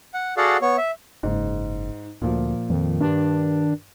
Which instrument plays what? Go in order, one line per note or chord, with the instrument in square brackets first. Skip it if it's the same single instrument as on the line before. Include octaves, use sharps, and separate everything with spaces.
[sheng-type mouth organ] F#5
F#4 G#4 A4 D5 F5 F#5
B3 C#5
E5
[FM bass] F#1 [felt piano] G#2
[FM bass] D2 [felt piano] A#2 F3
[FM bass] F2 [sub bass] D#3
[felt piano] G2 [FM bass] D4